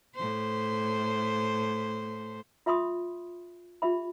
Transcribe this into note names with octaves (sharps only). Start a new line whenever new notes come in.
A2 C5
F4 E5 B5 C6 D#6
F4 G4 E5 B5